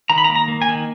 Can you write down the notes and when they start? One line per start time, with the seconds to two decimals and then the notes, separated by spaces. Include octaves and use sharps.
0.10 D#3 A#5
0.18 B5
0.24 A#5
0.29 A#3
0.35 A#5
0.48 A#3
0.62 G#5
0.68 D#3